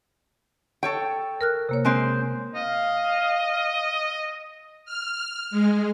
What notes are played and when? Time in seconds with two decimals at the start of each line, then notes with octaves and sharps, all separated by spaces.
0.83 A4 C#5 G5 C#6
1.41 A#4 F6 F#6
1.69 C3 A#3 C#5
1.85 G#3 C4 C5 F#6
2.55 D#5 F5
4.85 F6
5.51 G#3